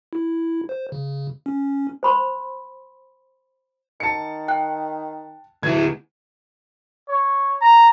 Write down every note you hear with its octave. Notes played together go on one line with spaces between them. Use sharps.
E4
C5
C#3
C#4
C5 B5 C6
D#3 A5 C#7
G5 F#6
D2 B2 E4 G#6
C#5
A#5